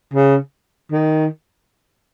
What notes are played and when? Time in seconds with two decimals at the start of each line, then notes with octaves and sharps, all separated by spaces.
0.13 C#3
0.91 D#3